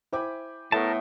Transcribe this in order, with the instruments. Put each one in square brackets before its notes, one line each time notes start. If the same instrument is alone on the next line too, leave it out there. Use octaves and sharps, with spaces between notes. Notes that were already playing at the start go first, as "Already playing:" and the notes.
[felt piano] E4 C5 D6 [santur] G5 G#5 B5
[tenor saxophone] A2 [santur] A3 B3 [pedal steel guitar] A#4 A5